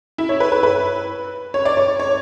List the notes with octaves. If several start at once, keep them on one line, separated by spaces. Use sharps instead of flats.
E4
C#5
B4
B4
B4
C#5
D5
C#5
C#5